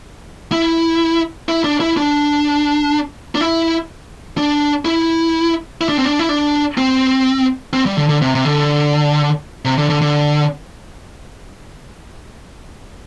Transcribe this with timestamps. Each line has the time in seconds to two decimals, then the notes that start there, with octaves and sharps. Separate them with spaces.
0.52 E4
1.48 E4
1.64 D4
1.80 E4
1.97 D4
3.35 D4
3.41 E4
4.37 D4
4.85 E4
5.81 E4
5.89 D4
5.98 C4
6.05 D4
6.19 E4
6.29 D4
6.77 C4
7.73 C4
7.86 G3
7.97 D3
8.09 D3
8.22 C3
8.35 C3
8.45 D3
9.65 C3
9.78 D3
9.90 D3
10.01 D3